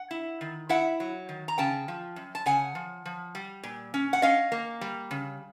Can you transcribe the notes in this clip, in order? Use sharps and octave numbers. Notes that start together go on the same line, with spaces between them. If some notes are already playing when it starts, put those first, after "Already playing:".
Already playing: F#5
E4
D#3
E4 E5 F#5
F#3
D#3
A#5
C#3 G5 A5
F3
F#2
A5
C#3 F#5 G#5
F3
F3
G3
A#2
C#4
F#5
C#4 D#5 F5
A#3
G3
C#3